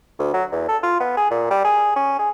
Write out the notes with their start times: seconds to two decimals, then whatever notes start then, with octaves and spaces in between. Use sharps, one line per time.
0.19 D2
0.34 F#3
0.52 E2
0.69 A4
0.83 F4
1.00 B3
1.17 G#4
1.31 A#2
1.51 G3
1.64 G#4
1.96 C#4
2.19 G#4